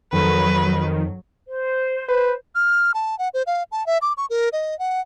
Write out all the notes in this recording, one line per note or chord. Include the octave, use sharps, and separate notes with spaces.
F2 D#3 F#3 B4
C5
B4
F6
A5
F#5
C5
F5
A5
E5
D6
C#6
A#4
D#5
F#5